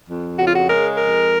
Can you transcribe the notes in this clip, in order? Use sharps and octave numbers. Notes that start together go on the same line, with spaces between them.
F2
C#3 F#4
F4
F#4
G#3 A#4
F2 A#4